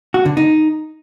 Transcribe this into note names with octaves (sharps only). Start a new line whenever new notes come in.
F#4
D3
D#4